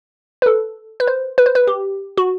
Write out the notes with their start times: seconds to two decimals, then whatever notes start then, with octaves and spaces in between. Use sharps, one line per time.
0.42 B4
0.46 A4
1.00 B4
1.07 C5
1.38 B4
1.46 C5
1.55 B4
1.67 G4
2.18 F#4